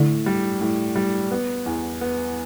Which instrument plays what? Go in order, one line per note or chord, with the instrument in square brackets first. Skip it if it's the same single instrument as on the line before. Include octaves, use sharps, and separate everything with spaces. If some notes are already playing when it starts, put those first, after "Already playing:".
Already playing: [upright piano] A2 [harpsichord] D3
[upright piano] G3
A2
G3
B3
E2
B3